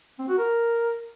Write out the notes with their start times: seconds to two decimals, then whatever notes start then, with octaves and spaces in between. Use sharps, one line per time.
0.19 C4
0.28 F#4
0.38 A#4